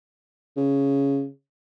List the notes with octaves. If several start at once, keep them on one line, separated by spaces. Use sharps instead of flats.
C#3